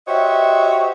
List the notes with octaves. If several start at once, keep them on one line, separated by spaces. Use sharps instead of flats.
F#4 G4 C5 C#5 D#5 E5